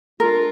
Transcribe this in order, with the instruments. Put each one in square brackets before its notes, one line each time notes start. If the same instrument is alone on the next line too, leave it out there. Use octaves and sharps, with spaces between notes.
[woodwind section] G#3 D4 F4 [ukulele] A#4